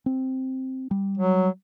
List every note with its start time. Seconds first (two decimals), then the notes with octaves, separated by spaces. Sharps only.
0.06 C4
0.91 G3
1.18 F#3